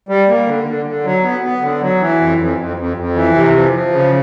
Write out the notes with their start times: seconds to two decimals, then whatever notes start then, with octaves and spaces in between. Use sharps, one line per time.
0.09 G3
0.28 A#3
0.46 D3
0.66 D3
0.86 D3
1.05 F#3
1.23 B3
1.43 B3
1.62 D3
1.82 F#3
2.00 E3
2.20 F2
2.38 F2
2.58 F2
2.77 F2
2.97 F2
3.15 E3
3.34 C3
3.54 F3
3.73 F3
3.92 C#3